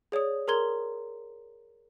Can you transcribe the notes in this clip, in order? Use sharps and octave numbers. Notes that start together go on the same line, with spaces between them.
G#4 C#5 D5 D#6
G#4 A#4 A#5 C6 G#6 G7